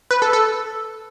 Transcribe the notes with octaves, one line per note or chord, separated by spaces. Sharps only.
B4
A4
A4